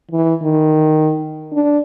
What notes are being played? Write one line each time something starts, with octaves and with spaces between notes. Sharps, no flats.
E3
D#3
D4